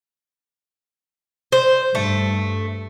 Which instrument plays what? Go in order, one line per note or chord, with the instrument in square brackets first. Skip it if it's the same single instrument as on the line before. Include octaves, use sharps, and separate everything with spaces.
[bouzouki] C5
[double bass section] G2 [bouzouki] A3